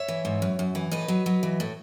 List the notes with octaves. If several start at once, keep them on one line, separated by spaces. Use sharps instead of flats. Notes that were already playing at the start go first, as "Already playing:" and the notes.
Already playing: C#5 E5
E3
G#2
F#2
F#2
E3
A2 B4 D#5
F#3
F#3
E3
A2